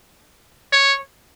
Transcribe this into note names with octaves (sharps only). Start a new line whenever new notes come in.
C#5